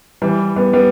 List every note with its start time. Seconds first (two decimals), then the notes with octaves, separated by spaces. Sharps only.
0.22 E3 G3
0.56 G3 B3
0.73 G3 B3